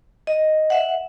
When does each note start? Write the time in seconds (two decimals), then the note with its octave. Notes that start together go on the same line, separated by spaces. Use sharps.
0.27 D#5
0.70 E5 F#5